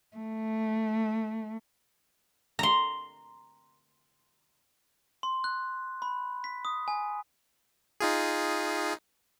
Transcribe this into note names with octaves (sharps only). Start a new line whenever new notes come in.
A3
A#5 C6
C6
F#6
B5
B6
D#6
G#5
D#4 F4 G#4